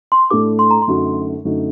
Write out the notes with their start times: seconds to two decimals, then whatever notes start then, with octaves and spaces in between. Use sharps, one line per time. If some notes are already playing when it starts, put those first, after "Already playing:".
0.12 C6
0.30 A2 A3 D4 A4 D6
0.59 C6
0.71 A#5
0.82 C6
0.88 F#2 D3 A3 D#4 F#4
1.45 F#2 D3 A3 D#4 F#4